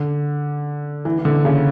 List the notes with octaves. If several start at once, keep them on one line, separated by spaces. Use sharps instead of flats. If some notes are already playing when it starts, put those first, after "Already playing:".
Already playing: D3
E3
E3
D3
C#3